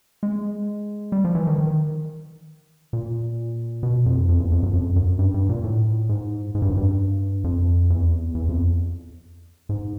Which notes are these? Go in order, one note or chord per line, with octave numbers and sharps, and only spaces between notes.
G#3
G3
F3
E3
D#3
D#3
A#2
B2
F2
F2
E2
F2
F#2
F2
F#2
G2
G2
A#2
A2
G#2
G#2
G2
F#2
G2
F2
E2
E2
F2
G#2